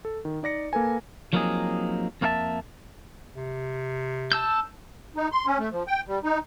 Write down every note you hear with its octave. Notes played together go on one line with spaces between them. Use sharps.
A4
D#3
D#4 D5 A#6 C#7
A#3 A4 B4 G#5
F3 F#3 A#3 C4 D#4 G#4
F2 A#3 C4 A4 E5 A5
C3
A5 E6 G6
D#4
C6
C#4
A3
F3
G5
G3
D#4